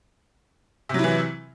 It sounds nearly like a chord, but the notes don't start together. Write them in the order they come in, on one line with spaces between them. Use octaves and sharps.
C3 F#3 E4 E3